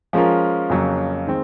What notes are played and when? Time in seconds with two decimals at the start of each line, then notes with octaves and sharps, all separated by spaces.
0.13 F3 G#3 C#4 F4 A#4
0.69 F2 C#3 F#3 A#3
1.27 D#3 G#3 C4